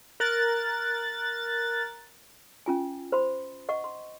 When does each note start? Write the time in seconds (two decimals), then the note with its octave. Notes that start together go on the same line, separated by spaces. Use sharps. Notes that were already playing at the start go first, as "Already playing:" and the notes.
0.20 A#4 F#6 A6
2.66 C#4 F4 G#5
3.12 C5 B5 C6
3.69 D#5 F#5 C#6
3.84 C6